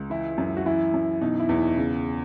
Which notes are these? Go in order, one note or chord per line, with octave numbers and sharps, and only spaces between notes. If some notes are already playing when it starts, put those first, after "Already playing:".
Already playing: C#2
E3 E4
F#2
F#4
E3 E4
F#2
B2 D#4
E4
E2
D#4
C#3